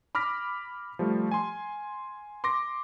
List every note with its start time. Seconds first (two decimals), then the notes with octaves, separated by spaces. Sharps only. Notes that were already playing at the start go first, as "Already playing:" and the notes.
0.15 B5 D6 F6 A#6 B6
0.99 F3 G3 A3
1.31 G#5 C6
2.44 C6 D6 A#6